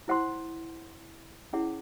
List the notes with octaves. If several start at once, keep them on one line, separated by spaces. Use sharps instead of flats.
E4 C5 F#5 C6
C#4 E4 G#4 C#5 F#5